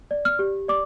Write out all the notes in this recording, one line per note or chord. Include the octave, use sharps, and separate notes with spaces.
D5
F6
G4
D5 D6